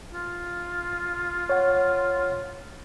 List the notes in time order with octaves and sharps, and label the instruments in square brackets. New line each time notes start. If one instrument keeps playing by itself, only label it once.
[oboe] F4
[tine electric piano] C#5 F#5